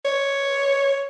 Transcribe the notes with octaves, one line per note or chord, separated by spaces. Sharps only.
C#5